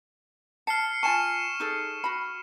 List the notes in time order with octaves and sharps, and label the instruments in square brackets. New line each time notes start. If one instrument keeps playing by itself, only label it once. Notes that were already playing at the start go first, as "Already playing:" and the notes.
[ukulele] A5 [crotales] F6 C7 C#7
[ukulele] F4 G#5 A5 [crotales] C#6 E7
[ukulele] D#4 G#4 A4
F#4 B5